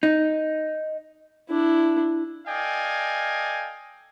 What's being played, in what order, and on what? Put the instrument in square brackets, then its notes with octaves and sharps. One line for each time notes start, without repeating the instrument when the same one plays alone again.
[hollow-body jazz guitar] D#4
[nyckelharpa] D4 E4
[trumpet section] A4 D5 D#5 F5 G5 G#5